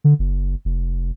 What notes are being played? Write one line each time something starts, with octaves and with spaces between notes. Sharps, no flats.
D3
F#1
F1